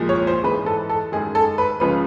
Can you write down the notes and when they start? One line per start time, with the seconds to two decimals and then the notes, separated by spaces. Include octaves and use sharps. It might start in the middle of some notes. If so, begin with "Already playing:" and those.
Already playing: C2 A#2 F3 G#3
0.09 C#5
0.27 C5
0.43 G#2 E3 G#3 B4
0.66 A4
0.89 A4
1.12 F#2 D#3 G#3 G#4
1.35 A4
1.58 B4
1.80 C#2 C#3 F3 B4